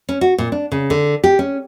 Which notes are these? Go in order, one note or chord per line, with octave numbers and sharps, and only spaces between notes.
C#4
F#4
A#2
D4
C#3
D3
G4
C#4